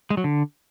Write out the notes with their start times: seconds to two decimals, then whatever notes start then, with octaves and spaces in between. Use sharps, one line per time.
0.10 G#3
0.17 F#3
0.24 D3